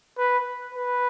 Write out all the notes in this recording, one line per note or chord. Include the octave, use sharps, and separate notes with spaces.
B4
B4